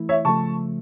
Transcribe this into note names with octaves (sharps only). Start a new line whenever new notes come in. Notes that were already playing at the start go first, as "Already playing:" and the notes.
Already playing: E3 A3 E4
C#5 E5
C#3 F3 A3 A5 C#6